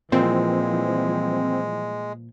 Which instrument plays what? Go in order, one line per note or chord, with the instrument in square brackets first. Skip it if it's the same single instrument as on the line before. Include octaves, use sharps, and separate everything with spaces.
[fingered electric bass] A#2 [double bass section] E3 F3 G3 [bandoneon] G#3 [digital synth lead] C4